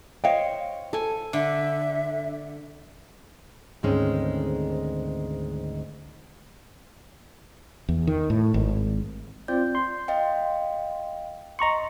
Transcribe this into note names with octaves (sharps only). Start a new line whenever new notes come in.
C5 C#5 D#5 F5 G5
A4 G#5
D3 E5
D2 G#2 D#3 G#3 C4 C#4
E2
D#3
A2
G#1
C4 F4 D5 G6
C6
D#5 F5 G5
D#5 A#5 C6 C#6 C#7